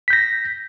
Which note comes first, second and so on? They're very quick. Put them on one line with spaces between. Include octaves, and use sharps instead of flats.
B6 G6 A#6